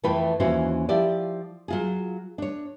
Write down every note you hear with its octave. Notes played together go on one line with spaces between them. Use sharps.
F2 E3 A3 F4 B4 G5
D#2 E3 C#4 F#4 C5
F3 E4 G4 D5
F#3 F4 G#4
D4 C#5